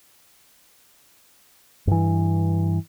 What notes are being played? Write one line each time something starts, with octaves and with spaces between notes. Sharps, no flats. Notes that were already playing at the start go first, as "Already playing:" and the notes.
G2 E3